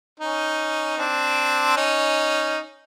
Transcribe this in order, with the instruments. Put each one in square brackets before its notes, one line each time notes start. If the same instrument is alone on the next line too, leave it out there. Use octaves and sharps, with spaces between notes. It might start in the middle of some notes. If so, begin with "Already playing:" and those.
[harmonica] C#4 D#4
C4 D4
C#4 D#4